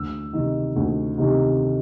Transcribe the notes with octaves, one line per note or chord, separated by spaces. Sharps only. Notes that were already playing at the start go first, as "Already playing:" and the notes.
Already playing: D2 E6
C3 D#3
D2
C3 D#3